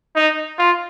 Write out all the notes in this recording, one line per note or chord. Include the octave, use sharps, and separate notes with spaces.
D#4
F4